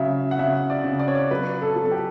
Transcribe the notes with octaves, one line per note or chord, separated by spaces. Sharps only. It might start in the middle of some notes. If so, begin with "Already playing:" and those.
Already playing: C#3 F#3 E5
F#5
C#3 E5
D5
C#3
D5
C#5
D5
F#3 B4
A4
F#3
A4
G4